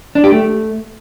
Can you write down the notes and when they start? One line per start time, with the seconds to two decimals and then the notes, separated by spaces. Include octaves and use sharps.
0.15 D4
0.24 G4
0.32 A3